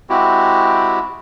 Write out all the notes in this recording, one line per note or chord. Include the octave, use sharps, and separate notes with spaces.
G#3 C4 E4 F#4 G4